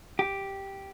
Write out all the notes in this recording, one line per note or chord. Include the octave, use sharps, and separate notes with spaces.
G4